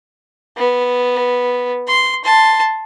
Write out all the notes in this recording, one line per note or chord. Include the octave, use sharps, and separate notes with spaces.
B3
C6
A5 C6